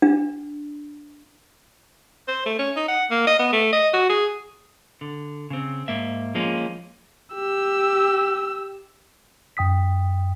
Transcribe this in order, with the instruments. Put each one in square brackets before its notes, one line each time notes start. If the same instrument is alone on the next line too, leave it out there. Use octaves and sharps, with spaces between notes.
[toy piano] D4
[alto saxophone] C5
A3
C#4
D#4
F#5
A#3
D#5
B3
A3
D#5
F#4
G#4
[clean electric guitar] D3
C#3 C4
G#2 A#3 E5
F3 G#3 A#3 C#4
[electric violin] G4 E6
[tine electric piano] F#2 G5 D#6 B6